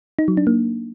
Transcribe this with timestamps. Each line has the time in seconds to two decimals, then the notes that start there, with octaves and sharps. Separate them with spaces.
0.19 D#4
0.28 F#3
0.37 D4
0.47 A#3